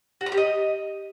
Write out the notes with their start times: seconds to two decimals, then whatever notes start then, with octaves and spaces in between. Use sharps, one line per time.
0.21 F#4
0.26 A#5
0.32 G4
0.37 D#5